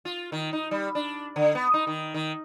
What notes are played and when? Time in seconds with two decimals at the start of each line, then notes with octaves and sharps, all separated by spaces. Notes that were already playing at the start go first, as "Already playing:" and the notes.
0.05 F4
0.32 D#3
0.53 D#4
0.71 G3
0.95 D4
1.36 D3
1.55 B3
1.74 D#4
1.87 D#3
2.14 D#3